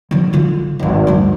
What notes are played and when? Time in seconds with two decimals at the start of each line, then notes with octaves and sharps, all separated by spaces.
0.11 D3 F#3
0.33 D3 F4
0.79 G#1 G#2
1.07 D2 G2